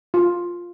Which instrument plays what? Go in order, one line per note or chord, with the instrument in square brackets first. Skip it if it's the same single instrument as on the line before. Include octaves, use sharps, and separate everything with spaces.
[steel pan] F4